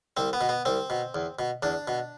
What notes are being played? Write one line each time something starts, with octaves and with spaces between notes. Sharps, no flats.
C2 C4
B3
B2
B3
C2 C4
B2
E2
B2
E2 D4
B2